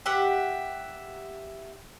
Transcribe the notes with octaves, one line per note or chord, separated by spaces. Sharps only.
G4 E5 F#5